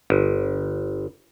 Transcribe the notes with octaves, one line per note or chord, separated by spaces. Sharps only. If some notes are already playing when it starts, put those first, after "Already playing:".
G1